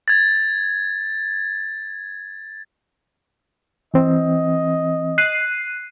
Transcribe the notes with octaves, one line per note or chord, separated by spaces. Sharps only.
G#6 A6
E3 C4 D#5
F#6 C7 D#7